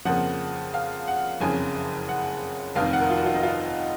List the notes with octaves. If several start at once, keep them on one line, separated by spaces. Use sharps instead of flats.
F2 C#3 F3 A#3 F#5
F5
F#5
F#1 F2 C#3 G#5
F#5
F1 F2 D#3 F5
F#5
A#4
F4
F#4
F4
D#4
F4